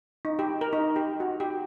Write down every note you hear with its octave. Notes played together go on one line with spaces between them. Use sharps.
D#4
G4
A#4
D#4
G4
F#4
G4